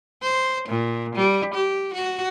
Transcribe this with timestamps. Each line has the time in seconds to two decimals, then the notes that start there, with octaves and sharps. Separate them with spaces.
0.22 C5
0.69 A#2
1.16 G3
1.54 G4
1.94 F#4